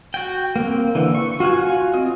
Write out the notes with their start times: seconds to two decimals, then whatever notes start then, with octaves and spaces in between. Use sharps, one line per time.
0.14 F#4 G5
0.56 A#3 C4
0.95 D3 E3
1.15 C#6
1.40 F4 F#4 F5 F#5 G#5
1.94 C4 D#5